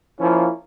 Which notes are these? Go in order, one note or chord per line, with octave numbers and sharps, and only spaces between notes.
F3 A#3 C#4 E4